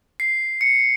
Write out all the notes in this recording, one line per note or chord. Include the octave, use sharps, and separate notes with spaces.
C7
C#7